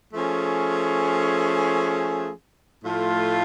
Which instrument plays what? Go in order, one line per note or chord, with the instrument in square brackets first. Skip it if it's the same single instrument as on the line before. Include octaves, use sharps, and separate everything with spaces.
[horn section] F3 A3 C#4 G#4
A2 F3 A3 F4